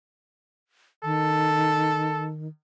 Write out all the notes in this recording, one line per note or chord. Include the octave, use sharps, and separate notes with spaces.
D#3 A4